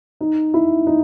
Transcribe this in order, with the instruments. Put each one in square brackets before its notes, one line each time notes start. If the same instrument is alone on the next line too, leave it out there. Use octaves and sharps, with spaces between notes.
[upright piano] D#4
E4
D#4